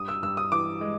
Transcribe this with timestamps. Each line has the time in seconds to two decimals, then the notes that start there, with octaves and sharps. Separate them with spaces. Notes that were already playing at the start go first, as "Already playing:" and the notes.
Already playing: G2 D#6
0.08 E6
0.22 G2 E6
0.37 D#6
0.52 E3 D6
0.81 G#3